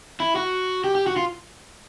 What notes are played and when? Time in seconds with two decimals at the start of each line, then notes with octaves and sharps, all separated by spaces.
0.20 E4
0.36 F#4
0.84 G4
0.95 G4
1.07 F#4
1.16 F4